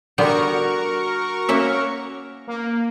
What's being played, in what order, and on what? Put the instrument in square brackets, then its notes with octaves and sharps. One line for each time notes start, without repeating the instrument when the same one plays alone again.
[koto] D3 G3 B3 [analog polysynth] F#4 A#4 C#6
[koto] A#3 C#4 E5
[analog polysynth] A#3